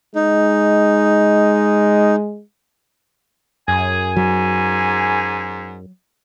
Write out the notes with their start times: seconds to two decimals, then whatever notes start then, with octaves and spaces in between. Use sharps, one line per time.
0.15 G#3 D#4
3.68 F#2 G#4 G#5
4.16 G#2 F#3